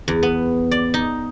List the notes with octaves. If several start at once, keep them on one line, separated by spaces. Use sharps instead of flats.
E2
B3
D5
D#4